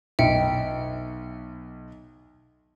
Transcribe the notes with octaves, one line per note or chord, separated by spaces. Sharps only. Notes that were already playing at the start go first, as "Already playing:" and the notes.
B1 E5 G5 C#7